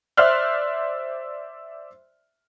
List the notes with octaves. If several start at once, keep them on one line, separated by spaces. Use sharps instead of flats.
C5 D5 E5 C6 F6 F#6